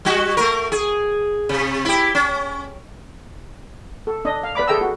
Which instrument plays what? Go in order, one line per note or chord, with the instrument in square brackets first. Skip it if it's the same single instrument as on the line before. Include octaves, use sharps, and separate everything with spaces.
[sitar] G3 F#4
A3 A#4
G#4
C3
E4 G4
C#4
[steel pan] A4
D4 D#5
F5
B4 D5 B5 D6
G#4 A4 E5 G5 A#5 E6
F#4